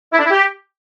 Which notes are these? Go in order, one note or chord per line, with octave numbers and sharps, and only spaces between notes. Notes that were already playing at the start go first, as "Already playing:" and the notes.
E4
D4
E4
G4